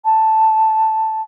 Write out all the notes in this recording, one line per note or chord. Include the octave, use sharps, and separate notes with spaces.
A5